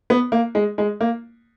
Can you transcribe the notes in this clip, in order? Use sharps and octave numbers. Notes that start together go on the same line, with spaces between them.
B3
A#3
G#3
G#3
A#3